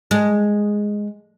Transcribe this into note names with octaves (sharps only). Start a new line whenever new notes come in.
G#3